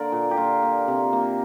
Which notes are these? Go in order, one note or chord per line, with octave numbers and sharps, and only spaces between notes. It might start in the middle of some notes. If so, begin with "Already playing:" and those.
Already playing: D3 A#3 A#4 C5 D5
A#2
G4
A#2 F4
A#3
C3
A#3